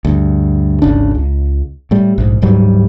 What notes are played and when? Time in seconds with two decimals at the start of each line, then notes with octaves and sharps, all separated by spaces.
0.05 D2 G2
0.82 D1 G#1 C#3 D4
1.15 C#2
1.91 A2 G3
2.18 A#1 G#2
2.42 D1 G#2 F#3 G3